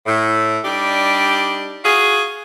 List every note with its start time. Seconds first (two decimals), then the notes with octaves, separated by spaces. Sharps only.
0.06 A2
0.64 G3 D4 D#4 G4
1.84 F4 F#4 G#4